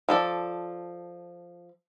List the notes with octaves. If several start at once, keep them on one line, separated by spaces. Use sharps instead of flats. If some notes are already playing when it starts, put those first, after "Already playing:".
F3 A4 D5